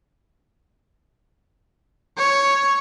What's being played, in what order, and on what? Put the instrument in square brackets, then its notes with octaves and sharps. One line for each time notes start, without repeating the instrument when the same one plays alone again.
[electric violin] C#5